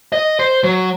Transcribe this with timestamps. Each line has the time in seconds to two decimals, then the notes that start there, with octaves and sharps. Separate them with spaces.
0.13 D#5
0.39 C5
0.64 F#3